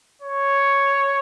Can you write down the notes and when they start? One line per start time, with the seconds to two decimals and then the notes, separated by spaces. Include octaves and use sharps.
0.22 C#5